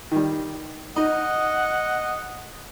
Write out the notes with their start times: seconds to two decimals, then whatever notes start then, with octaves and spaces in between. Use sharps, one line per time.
0.11 D#3 G3
0.96 D#4 D#5 F#5